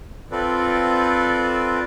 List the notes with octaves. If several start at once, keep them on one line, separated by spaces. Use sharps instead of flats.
C4 F4 A4 B4 D5